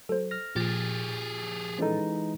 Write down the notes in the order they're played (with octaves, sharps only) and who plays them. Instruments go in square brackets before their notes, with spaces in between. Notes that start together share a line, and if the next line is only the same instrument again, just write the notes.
[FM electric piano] F#3 [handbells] A4 C5
[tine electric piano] F6 A#6
[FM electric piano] A#2 F3 A6 [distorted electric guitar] G4 G#4
[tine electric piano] E3 G#3 D#4 [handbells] C#4 A4